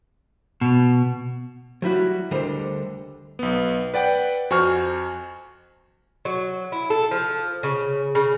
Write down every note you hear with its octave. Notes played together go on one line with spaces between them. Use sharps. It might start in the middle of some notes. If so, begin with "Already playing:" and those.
B2
F#3 G3 E4 F#4
D2 D3 G3 A#4 C5 D#5
B1 B3
B4 D5 F#5 G5
F2 F#4 C5 G#5 C#6 F6
F#3
E4
A4
F3
C#3
C#3